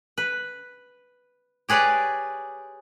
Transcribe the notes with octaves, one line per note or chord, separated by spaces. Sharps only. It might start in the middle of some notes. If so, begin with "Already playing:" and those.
B4
G4 G#4 B4 C#5 D5